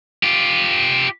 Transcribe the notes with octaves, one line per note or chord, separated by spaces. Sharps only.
F4 G4